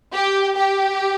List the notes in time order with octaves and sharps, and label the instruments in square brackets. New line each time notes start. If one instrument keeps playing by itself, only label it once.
[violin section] G4
G4